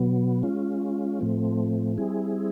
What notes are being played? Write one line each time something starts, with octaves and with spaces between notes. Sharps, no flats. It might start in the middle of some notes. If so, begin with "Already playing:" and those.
Already playing: B2 F#3 B3
G#3 C#4 F4
A2 F3 A3 C4
G3 C4 E4 G#4